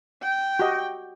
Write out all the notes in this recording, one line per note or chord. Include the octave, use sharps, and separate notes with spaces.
G5
F#4 G4 D#5